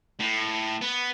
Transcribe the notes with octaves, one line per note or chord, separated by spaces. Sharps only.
A2
B3